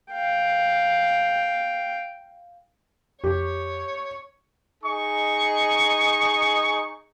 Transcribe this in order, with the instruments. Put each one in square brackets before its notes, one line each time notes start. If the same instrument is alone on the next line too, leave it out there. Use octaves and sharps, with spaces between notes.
[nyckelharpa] F5 G5
[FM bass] F2 [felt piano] G4 [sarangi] C#5
[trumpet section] D#4 G#4 D#5 C#6